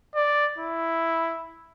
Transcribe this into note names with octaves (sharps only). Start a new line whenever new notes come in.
D5
E4